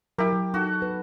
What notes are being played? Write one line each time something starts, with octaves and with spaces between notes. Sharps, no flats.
F#3 E4 G4 A#4
F#3
D#4 F#4 A4
B4